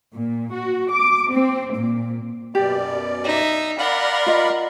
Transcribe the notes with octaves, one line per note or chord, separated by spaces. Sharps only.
A#2
F#4
D6
C4
A#2
F#2 B2 G4 D5
D#4 E5
A#4 D5 F5 F#5 B5
F4 D#5